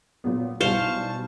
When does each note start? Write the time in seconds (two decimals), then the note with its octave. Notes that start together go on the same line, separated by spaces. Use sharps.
0.24 A#2 F#3 B3
0.61 B1 G3 E4 F#4 C5 F5 A5 C#6